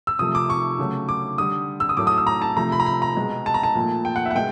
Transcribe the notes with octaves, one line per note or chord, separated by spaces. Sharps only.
E6
C3 F3 A3 D#6
D6
C#6
C#3 F#3 A3
D6
D3 G3 D#6
E6
D#6
A2 F#3 A3 D6
D#6
E6
A#5
A5
C3 F3 A3 A#5
B5
A#5
B5
A#5
B2 G#3
A5
A#5
A5
A#2 F3 A3
G5
F#5
E5
F#5
B2 G#3 G5